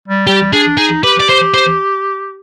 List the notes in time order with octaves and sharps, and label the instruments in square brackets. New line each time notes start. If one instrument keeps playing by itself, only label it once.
[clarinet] G3
[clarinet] G3 [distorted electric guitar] G4
[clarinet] D4 [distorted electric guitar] G#4
[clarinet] D#4 [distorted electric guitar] G#4
[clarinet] G4 [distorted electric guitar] B4
[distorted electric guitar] D5
C5
C5